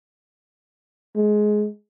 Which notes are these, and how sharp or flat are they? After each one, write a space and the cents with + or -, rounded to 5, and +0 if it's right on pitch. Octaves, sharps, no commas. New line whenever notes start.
G#3 +15